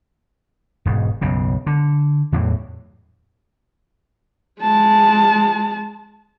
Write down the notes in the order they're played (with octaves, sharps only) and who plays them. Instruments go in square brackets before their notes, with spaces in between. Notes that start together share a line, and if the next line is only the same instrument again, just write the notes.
[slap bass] E1 G#2
B1 F#2 C#3
D3
E2 A2 E3 F#3
[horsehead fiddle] G#3 A5